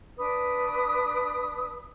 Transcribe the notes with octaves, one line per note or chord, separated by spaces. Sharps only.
D4 B4 D#6